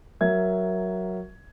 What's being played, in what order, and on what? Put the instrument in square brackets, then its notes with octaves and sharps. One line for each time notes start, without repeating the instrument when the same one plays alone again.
[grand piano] F#3 A#4 E5 G#6